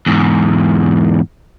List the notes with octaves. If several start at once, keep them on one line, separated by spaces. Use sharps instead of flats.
E2 G#2